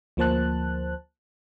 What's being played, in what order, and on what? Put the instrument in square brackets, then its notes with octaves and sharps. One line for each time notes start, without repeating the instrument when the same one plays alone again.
[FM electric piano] D2 F3 A#3 C5 A5 F#6